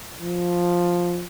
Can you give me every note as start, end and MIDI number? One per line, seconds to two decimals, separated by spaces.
0.22 1.25 53